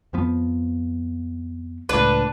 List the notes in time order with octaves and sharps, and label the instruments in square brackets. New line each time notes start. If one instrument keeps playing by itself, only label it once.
[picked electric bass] F2 F3 B3
[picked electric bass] C#2 A2 [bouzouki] D4 B4